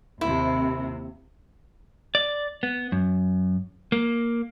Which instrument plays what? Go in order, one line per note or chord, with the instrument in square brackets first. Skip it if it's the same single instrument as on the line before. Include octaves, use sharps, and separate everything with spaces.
[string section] D#2 C3 [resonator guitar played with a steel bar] E4
[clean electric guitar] D5
B3
F#2
A#3